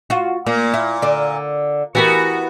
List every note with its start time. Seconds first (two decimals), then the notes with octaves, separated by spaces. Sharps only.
0.10 F4 F#4
0.46 A#2 A#3
0.74 E4
1.02 D3 D5
1.95 E3 B3 F#4 G4 A#4